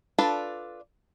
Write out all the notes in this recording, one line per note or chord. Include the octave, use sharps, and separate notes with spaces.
D4 F4 A4 B4 D5